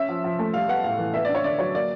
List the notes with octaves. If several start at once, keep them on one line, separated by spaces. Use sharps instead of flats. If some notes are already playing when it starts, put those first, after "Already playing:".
Already playing: C#4 E5
F3
F3
A3
G3 F5
B3 F#5
A2 F5
E3
B3 E5
D5
D4
C#5
D3 D5
F#3 C#5
A#3 D5